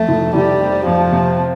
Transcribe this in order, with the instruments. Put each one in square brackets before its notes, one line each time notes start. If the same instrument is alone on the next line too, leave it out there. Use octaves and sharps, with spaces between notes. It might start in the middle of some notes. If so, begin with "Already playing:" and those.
Already playing: [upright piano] F2 [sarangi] A3
[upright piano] F1
[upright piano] F1 [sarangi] G3
[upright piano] C3
[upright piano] F2 [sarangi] F3
[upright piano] C3